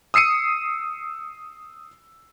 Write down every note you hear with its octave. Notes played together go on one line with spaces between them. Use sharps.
D#6 E6 C7 C#7 D#7